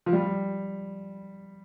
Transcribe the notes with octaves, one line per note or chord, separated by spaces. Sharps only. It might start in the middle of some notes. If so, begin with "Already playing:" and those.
F3
G3